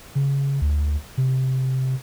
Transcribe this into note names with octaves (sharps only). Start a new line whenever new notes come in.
C#3
D2
C3